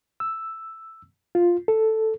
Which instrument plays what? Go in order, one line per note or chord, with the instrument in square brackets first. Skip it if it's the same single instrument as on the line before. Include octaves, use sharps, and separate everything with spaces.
[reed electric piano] E6
F4
A4